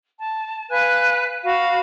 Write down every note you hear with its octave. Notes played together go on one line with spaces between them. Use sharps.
A5
B4 F5 G#5 F#6
F#4 F5 B5